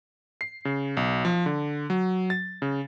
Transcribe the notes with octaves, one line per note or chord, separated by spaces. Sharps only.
C7
C#3
B1
F3
D3
F#3
A6
C#3